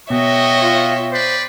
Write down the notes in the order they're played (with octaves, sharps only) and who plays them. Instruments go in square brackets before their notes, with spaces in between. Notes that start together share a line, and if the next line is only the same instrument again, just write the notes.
[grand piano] B2 [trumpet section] F#4 D#5 [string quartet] C#5 E5 G5
[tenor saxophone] F4
[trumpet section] B4 D5 [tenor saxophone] C5